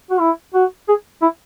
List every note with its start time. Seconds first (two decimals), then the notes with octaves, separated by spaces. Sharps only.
0.10 F#4
0.20 E4
0.54 F#4
0.88 G#4
1.22 E4